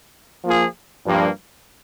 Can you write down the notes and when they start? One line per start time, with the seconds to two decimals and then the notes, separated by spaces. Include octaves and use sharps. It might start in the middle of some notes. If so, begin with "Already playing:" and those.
0.43 F3 A#3 F4 G#4
1.05 G2 F3 A#3